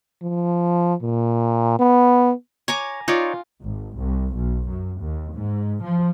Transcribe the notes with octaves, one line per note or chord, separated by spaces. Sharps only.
F3
A#2
B3
C#5 G#5 A#5 D6
D#4 F4 C#5 D5
G#1
C2
B1
F#2
D#2
G#2
F3